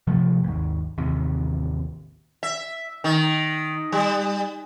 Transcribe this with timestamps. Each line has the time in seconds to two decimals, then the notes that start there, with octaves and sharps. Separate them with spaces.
0.07 G2 C3 F3 A3
0.44 G#1 D#2
0.98 A1 D#2 C3
2.43 E5
3.04 D#3
3.92 G3